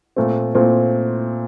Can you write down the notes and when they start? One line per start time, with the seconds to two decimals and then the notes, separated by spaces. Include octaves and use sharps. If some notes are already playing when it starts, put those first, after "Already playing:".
0.16 A#2 A3 C4
0.55 A#2 A3 C4